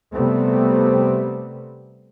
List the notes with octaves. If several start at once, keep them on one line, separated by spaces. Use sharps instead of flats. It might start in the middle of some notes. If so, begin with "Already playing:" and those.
C3 G3 A3 B3 C4